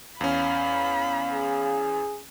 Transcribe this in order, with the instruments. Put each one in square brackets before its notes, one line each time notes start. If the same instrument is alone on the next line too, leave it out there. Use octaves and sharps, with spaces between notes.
[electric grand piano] E2 C#4 [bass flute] F5 [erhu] B5
[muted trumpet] G#4